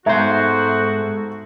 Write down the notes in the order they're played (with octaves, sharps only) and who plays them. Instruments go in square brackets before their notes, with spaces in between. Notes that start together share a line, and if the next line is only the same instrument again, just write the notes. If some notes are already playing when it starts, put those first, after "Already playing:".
[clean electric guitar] G#2 C5 [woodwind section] A3 B3 F#4 [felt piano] E5 A#5 G#6